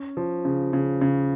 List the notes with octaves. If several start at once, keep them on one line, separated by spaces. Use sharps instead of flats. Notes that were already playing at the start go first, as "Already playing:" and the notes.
Already playing: C#4
F3
C#3
C#3
C#3